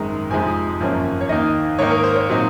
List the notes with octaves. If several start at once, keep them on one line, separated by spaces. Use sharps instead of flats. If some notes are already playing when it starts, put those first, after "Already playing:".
Already playing: G#1 F#2 D#3 G#3 D#4
F2 C3 F3 G#3 D#4 G#5
G#1 F#2 F3 A#3 C#4
C#5
D#2 D#3 A#3 D#4 D#5
G#2 D#3 A#3 D#4 C#5
A#4
C5
C#5
A#2 F#3 C4 D#4